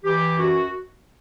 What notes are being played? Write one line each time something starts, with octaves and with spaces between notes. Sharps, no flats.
E3 G4
F#2 F#4